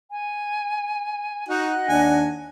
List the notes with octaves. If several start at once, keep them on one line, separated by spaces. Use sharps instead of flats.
G#5
D#4 F#4 D#5 F#5 F#6
D#2 D4 G#5